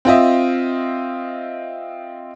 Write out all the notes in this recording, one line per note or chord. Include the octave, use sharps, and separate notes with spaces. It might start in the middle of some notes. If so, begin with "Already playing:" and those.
C4 F4 D#5 E5